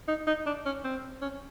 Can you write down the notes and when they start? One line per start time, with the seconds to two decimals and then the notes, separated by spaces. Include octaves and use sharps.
0.08 D#4
0.27 D#4
0.46 D4
0.66 C#4
0.84 C4
1.22 C#4